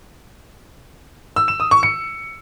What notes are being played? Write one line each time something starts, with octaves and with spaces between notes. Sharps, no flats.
E6
E7
D#6
C#6
C#7